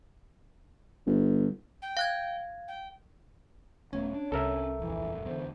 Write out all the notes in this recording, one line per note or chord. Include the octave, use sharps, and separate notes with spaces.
G1
G5
F5 F#6 G#6
G5
D#1 A3 B3 C#4 C#5
D4
C2 C4 C#4 A4 A#4 E5
D#1 F2 E3
E2 D3 C5